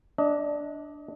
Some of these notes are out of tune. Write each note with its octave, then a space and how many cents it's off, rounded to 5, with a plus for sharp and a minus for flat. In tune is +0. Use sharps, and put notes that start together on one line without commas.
D4 +0 D#5 +25